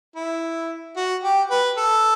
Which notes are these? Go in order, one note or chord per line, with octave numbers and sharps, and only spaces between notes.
E4
F#4
G4
B4
A4